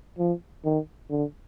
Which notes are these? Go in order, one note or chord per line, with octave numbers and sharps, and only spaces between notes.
F3
D#3
D3